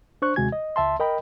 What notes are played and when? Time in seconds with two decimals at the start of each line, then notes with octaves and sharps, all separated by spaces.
0.22 D4 C5 C#6 F#6
0.36 D#2 C3 G#3 F#4 G#5 G#6
0.52 D#5
0.76 C#2 E5 A5 C6
1.00 A#4 D#5 G5 B5